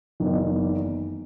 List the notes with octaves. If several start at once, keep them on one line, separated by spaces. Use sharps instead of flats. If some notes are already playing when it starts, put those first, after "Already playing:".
F#1 E2 D#3